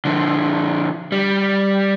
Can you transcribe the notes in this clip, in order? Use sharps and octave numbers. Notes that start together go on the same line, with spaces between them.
D3 F3
G3